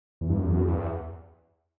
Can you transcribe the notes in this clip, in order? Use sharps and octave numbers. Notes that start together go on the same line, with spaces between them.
E2
G2
F#2
E2
F#2
E2
G2
E2